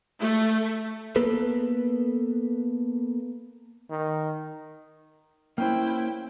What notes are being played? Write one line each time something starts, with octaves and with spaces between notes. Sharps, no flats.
A3
A#3 B3 A4 B4
D#3
A#3 C#4 E4 C5 G5